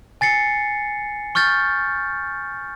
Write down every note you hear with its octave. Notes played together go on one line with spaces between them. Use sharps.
G#5 A6 C7 C#7
C#6 F6 G6 A6